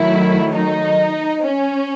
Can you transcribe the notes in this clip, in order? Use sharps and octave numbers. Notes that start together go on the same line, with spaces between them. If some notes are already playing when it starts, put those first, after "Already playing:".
Already playing: D#3 F#3 A3 E4
D#4
C#4